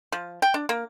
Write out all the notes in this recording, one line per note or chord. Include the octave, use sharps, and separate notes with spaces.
F3
G5
D4
A#3